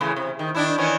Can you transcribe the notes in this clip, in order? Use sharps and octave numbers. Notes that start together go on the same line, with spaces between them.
A2 C#3 E3
C3
D#3
D#3 D4 E4
D#3 E3 C#4